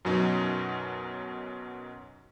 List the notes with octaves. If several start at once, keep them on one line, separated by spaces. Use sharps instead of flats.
F#2 B2 F#3 C#4 D#4